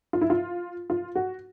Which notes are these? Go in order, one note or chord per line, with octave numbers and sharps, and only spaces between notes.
F4
E4
F4
F4
F#4